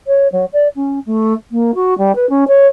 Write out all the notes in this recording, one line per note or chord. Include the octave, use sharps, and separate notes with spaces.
C#5
F#3
D5
C#4
A3
A#3
F#4
G3
B4
C#4
C#5